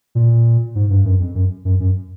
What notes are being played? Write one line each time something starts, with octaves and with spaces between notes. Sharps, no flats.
A#2
G#2
G2
F#2
F2
F#2
F#2
F#2